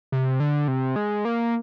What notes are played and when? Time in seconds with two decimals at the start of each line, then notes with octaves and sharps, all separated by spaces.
0.12 C3
0.40 D3
0.68 C3
0.96 G#3
1.25 A#3